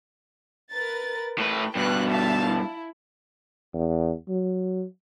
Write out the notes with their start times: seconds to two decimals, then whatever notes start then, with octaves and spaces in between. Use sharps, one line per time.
0.72 A#4 B4 A6
1.38 A2 B4 G5
1.75 G2 B2 B4 F#6
2.10 E5 F5 A5
2.48 E4
3.74 E2
4.29 F#3